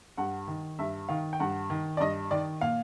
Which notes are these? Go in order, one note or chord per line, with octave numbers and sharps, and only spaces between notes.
G2 F#5
D#3
G2 E5
D#3 F5
G5
G2 F#5
D#3
D5
G2 D#5
D#3 D5
A#2 F5